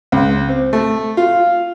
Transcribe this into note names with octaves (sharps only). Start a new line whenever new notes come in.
C#2
C4
A3
F4